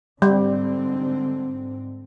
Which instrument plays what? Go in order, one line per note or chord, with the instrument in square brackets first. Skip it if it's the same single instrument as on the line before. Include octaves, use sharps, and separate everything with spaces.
[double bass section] G#2 D3 C4 [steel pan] G3